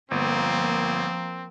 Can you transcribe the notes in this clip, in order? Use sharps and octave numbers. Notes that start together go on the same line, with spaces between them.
G1 F3 A#3 C4